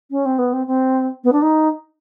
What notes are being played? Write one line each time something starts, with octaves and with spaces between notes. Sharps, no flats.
C#4
C4
B3
C4
C4
B3
D4
D#4